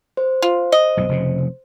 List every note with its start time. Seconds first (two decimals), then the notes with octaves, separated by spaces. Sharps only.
0.17 C5
0.42 F4
0.72 D#5
0.97 B1 G2
1.09 F1 F2 C#3